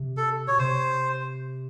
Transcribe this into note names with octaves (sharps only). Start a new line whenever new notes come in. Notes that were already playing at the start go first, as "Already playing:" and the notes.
Already playing: C3
A4
B2 C#5
C3 C5